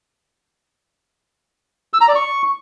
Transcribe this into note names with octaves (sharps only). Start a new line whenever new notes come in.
E6
A#5
D5
C#6